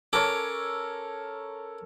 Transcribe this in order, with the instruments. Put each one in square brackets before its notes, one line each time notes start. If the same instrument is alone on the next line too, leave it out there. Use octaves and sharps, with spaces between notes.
[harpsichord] C#4 A#5 D6 [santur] A4 A#4 C#5